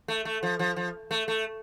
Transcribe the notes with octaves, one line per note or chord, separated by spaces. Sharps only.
A3
A3
F3
F3
F3
A3
A3